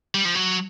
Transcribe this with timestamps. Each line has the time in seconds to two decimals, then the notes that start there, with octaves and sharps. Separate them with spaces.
0.14 G3
0.25 F3
0.35 F#3